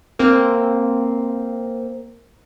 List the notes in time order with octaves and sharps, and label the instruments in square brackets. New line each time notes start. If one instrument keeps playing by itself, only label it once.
[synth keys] A#3 C4